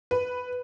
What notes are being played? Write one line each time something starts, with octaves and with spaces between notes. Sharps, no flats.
B4